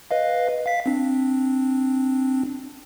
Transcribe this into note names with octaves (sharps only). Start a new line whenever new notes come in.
B4 D#5 F5
F5 B6
C4 D4